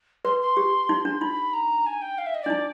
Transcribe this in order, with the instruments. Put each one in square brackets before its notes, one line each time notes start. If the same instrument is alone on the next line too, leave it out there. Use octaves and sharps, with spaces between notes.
[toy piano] B4 [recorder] C6
[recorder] C6
[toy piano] G4
D#4
D4
[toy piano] D#4 [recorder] B5
[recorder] A#5
G#5
G5
F5
E5
D#5
[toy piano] D4 [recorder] D5
[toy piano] D#4